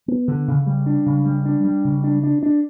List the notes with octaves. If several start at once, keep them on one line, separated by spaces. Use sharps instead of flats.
B3
D3
C#3
G3
D4
C#3
G3
D4
G3
C#3
D4
D4
D4